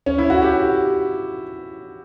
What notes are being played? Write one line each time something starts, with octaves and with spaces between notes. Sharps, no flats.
C#4
E4
F#4
G4